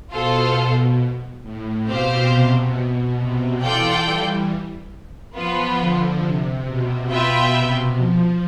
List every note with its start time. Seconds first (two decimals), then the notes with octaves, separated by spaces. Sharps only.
0.11 B2 F4 A4 C5 F5
1.43 A2
1.86 B2 C4 G4 C5 F5
2.30 C3
2.73 B2
3.17 C3
3.61 E3 F4 A4 D5 G5
4.04 G3
5.35 F3 B3 F4 B4
5.78 D3
6.22 C3
6.66 B2
7.09 B2 F4 B4 E5 G5
7.53 C3
7.97 F3